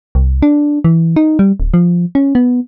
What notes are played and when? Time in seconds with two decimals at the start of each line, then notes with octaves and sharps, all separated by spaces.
0.15 C2
0.43 D4
0.84 E3
1.16 D#4
1.39 G3
1.60 D1
1.74 F3
2.15 C#4
2.35 B3